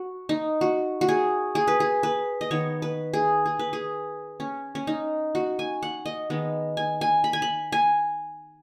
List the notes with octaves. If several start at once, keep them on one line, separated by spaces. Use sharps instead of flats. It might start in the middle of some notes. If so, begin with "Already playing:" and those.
Already playing: F#4
D#4
F#4
F#4
G#4
G#4
B4
G#4
B4
D#5
D#3 B3 C#5
B4
G#4
G#4
B4
G#4
C#4
C#4
D#4
F#4
G#5
F#5
D#5
D#3 G#3 B3
G#5
G#5
B5
G#5
B5
G#5